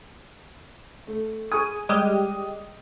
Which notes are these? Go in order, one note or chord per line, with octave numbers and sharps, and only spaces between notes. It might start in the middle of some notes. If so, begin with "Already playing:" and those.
A3
G#4 G#5 C#6 D#6
G3 G#3 G4 D#5 D#6